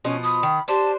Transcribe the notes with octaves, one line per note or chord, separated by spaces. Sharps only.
B2 F3 C#4 D#5
B5 D#6
D#3
D4 G4 C5 A5